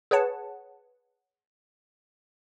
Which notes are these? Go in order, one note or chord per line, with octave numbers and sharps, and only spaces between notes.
G#4 B4 C#5 F#5 A5